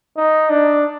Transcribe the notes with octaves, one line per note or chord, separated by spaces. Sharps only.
D#4
D4